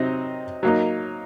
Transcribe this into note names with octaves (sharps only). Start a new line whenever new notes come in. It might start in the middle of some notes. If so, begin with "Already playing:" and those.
Already playing: C3 F#3 C4 D#4
F#3 A#3 D#4